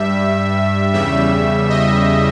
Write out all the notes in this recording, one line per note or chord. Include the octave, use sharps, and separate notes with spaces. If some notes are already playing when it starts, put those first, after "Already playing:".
Already playing: G2 G3 E5
E2 C#3 G3 E5
D#5